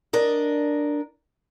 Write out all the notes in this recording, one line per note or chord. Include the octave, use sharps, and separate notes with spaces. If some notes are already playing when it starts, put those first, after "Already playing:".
D4 A#4 D#5